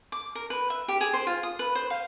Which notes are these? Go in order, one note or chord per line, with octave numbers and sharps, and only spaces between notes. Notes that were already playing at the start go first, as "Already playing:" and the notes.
D6
A#4
B4
E5
G4
G#4
C5
F4
D#6
B4
C5
F5